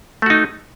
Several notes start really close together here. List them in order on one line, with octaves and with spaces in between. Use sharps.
A3 F#4 D#4